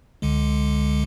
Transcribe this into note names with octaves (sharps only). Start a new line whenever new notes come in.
C#2 D3 G#3